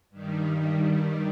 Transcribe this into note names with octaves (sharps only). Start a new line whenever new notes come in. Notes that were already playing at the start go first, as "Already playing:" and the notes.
G2 D#3 G3